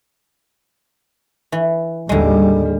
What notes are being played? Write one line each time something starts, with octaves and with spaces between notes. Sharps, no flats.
E3
A1 D#2 D3 G3 G#3